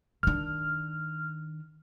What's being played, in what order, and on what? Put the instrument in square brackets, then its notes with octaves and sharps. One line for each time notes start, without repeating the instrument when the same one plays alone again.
[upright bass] D#3 D4 [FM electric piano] F6